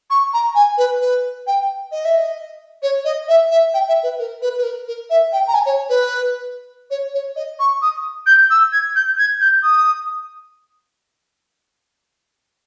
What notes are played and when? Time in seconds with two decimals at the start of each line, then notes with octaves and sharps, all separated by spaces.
0.10 C#6
0.34 A#5
0.55 G#5
0.78 B4
1.01 B4
1.47 G5
1.92 D#5
2.05 E5
2.18 D#5
2.83 C#5
3.05 D#5
3.28 E5
3.51 E5
3.74 G5
3.88 E5
4.03 B4
4.19 A#4
4.42 B4
4.58 B4
4.63 A#4
4.87 A#4
5.10 E5
5.33 G5
5.47 A#5
5.54 G#5
5.66 C#5
5.89 B4
6.90 C#5
7.14 C#5
7.36 D#5
7.60 C#6
7.82 D#6
8.26 G6
8.50 E6
8.72 G#6
8.96 G6
9.18 G#6
9.41 G6
9.63 D#6